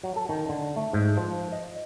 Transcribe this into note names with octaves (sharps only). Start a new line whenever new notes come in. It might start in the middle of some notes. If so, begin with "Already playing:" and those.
F#3
A4
D#3
D3
A3
G#2
F3
D#5